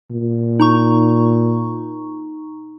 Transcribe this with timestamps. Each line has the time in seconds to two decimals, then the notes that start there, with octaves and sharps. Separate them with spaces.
0.12 A#2
0.60 D#4 A#5 C#6